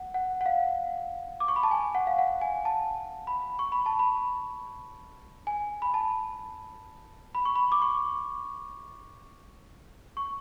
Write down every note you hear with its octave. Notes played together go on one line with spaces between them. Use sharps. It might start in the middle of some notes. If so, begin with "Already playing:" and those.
Already playing: F#5
F#5
F#5
F5
D6
C#6
B5
A5
G#5
F#5
F5
F#5
G#5
A5
B5
C#6
B5
A5
B5
G#5
B5
A5
B5
C#6
B5
D6
C#6
C#6